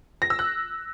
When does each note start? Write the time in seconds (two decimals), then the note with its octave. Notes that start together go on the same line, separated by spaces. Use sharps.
0.22 A#6
0.30 E6
0.39 F#6